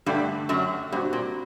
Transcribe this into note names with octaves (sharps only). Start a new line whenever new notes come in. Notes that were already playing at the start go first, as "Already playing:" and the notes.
G2 D3 G3 A3 D4 G4
F#2 F#3
G2 G3 C4 F#4
A#2